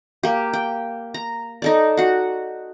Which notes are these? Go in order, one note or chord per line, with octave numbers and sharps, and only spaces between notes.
A#3 G4
G5
A#5
D#4 A4 D5
F#4 F#5